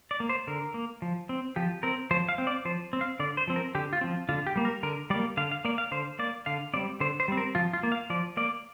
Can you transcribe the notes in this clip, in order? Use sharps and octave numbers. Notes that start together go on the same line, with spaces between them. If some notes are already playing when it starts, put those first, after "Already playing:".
D5
A#3
C5
D3 A#4
A#3
F3
C4
F3 G4
C4 A#4
F3 C5
F5
C4
D5
F3 C5
C4
F5
D3 D5
C5
F3 C4
A#4
D3 G4
F4
F3 C4
D3 F4
G4
G3 A#3
A#4
D3 A#4
G3 A#3 D5
D3 F5
F5
A#3 D5
F5
D3 C5
A#3 D5
D3 F5
G3 C4 D5
D3 C5
C5
G3 C4
A#4
F3 F4
F4
A#3
F5
F3 D5
A#3 D5